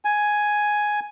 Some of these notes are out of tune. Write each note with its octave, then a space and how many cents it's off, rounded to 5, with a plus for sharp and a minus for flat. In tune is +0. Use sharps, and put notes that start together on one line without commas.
G#5 +5